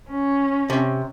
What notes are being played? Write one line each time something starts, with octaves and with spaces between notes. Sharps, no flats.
C#4
C3